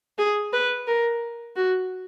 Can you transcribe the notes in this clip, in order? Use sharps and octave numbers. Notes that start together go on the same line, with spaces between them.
G#4
B4
A#4
F#4